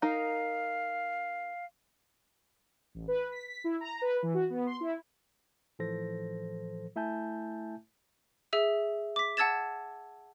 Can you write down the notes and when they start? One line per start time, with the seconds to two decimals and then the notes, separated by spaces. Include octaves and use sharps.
0.02 D#4 A#4 F5
2.95 A1
3.08 B4
3.32 B6
3.48 B6
3.64 E4
3.80 A#5
4.01 B4
4.23 E3
4.34 F#4
4.50 B3
4.67 C6
4.81 E4
5.79 A2 E3 F3 A4 C5 A#6
6.96 A3 E4 E5 G#5 A5 G6
8.53 G#4 E5 E6
9.16 D6 B6
9.37 F#5 A5 E6 G#6 A6 E7